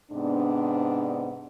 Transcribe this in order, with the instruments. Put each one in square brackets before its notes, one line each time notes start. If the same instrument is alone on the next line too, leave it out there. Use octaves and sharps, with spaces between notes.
[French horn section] G#2 C3 B3 D4